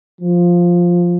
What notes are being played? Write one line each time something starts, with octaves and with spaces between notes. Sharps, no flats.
F3